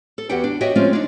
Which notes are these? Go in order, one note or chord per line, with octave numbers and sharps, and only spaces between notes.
A4
E2 F#4 G4 B4 F#5 G5
D4
F#4 G4 C#5 D#5 E5 G5
F3 G#3 A3 C4 C#4 F4
D4 D#4